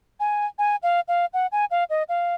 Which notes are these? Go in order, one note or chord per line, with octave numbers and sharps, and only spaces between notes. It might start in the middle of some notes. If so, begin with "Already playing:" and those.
G#5
G#5
F5
F5
F#5
G#5
F5
D#5
F5